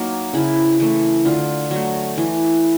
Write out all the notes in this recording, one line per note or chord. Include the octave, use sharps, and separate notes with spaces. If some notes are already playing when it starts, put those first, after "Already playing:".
Already playing: F#3 A#3 D#4
C#3 E4
E3 A3
D3 F4
F#3 A3
E3